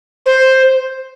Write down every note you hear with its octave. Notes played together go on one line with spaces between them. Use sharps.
C5